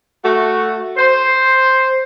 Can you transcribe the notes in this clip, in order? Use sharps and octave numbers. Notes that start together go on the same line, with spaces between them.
A3 F#4
C5